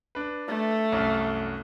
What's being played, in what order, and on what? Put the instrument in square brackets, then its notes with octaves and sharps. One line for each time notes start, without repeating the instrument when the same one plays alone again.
[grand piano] D4 B4
[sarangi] A3
[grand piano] C2 F#2